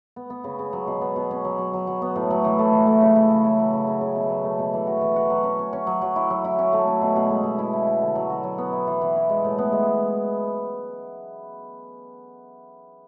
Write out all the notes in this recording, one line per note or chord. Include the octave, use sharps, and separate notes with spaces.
B3
B3
C#3
C#3
F#3
B2
B3
B2
C#4
F#3
F#3
F#3
F#3
B3
A2
F#3
E3
A3
E3
A3
C#3
E4
C#3
E4
F#3
C#3
C#3
C#3
B2
F#3
A3
B2
E3
F#4
E3
F#4
F#3
C#4
C#4
C#4
F#3
F#3
E4
F#3
E4
C#4
A3
C#4
B2
B2
G#3
B2
E4
E4
E4
D3
F#3
F#4
F#3
B3
E4
E3
E3
E4
G#3
A2
B3
G#3